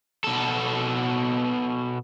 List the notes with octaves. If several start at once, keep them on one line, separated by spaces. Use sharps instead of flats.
B2 A4